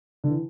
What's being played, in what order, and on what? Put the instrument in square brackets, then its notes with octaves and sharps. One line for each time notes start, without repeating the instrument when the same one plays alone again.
[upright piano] D3
E3